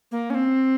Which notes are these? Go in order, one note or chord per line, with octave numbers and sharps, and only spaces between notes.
A#3
C#4
C4